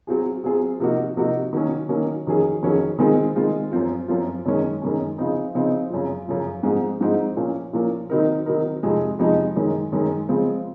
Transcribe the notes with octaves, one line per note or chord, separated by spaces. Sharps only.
F#3 C4 F4 G#4
F#3 C4 F4 G#4
C3 F3 A#3 D#4 F#4
C3 F3 A#3 D#4 F#4
D#3 F#3 A#3 C#4
D#3 F#3 A#3 C#4
F2 D#3 F#3 C#4 G#4
F2 D#3 F#3 C#4 G#4
D#3 G#3 C4 F4 G#4
D#3 G#3 C4 F4 G#4
F#2 F3 C4 F4
F#2 F3 C4 F4
F#2 D#3 G#3 C#4
F#2 D#3 G#3 C#4
C#3 F3 C4 D#4
C#3 F3 C4 D#4
F#2 C#3 F3
F#2 C#3 F3
G#2 F3 C4 D#4 G#4
G#2 F3 C4 D#4 G#4
A#2 F3 A#3 C#4
A#2 F3 A#3 C#4
D#3 F#3 C4 D#4 A#4
D#3 F#3 C4 D#4 A#4
F2 C3 F3 G#3 D#4
F2 C3 F3 G#3 D#4
F#2 D#3 G#3
F#2 D#3 G#3
C#3 F3 G#3 C4